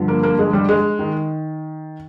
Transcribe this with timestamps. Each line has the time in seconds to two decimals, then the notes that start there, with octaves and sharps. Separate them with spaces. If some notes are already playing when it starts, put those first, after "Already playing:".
Already playing: G2 D3 F3
0.08 A#3
0.23 A#3
0.39 G#3
0.53 G3
0.69 G#3
0.99 D#3